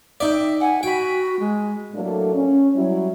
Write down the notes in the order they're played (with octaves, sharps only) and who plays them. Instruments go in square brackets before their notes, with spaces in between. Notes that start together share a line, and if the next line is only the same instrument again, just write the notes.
[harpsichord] D#4 D5 [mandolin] E5 G5 E6
[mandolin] F#5 [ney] G#5
[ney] F#4 [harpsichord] G5 [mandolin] G#5 B5
[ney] G#3
[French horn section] A2 F#3 A3 A#3 D4 A4
C#4
F#3 G3 E4